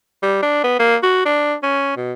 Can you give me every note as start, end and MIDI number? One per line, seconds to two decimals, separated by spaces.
0.23 0.40 55
0.43 0.59 62
0.64 0.77 59
0.79 0.96 58
1.03 1.25 66
1.25 1.55 62
1.63 1.96 61
1.97 2.13 47